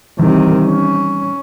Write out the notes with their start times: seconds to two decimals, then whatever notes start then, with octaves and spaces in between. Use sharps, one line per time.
0.19 C3 D#3 E3 G3
0.67 C#4